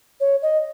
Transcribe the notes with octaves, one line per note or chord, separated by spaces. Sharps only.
C#5
D#5